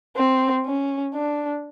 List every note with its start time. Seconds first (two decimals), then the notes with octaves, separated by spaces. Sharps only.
0.16 C4
0.66 C#4
1.14 D4